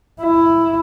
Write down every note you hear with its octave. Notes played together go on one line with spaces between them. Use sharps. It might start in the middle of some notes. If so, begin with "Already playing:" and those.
E4